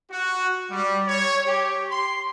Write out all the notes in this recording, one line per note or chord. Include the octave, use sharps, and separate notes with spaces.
F#4
G3
C#5
G4
C6